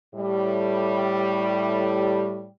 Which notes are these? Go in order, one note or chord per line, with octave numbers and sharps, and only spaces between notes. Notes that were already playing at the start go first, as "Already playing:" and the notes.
A2 G3